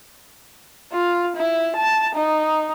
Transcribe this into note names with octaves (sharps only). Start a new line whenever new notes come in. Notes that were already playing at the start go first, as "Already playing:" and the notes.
F4
E4
A5
D#4